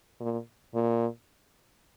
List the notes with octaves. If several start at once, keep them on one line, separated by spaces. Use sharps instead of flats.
A#2
A#2